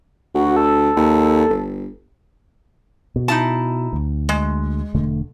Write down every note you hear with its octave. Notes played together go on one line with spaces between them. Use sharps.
D2 F#4
A4
D#2
G1
B2
D#4 E4 A5
D2
G#3
E1 D3 A3